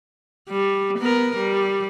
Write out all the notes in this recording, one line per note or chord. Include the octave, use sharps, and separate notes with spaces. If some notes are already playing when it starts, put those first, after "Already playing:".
G3
B3 A#4
G3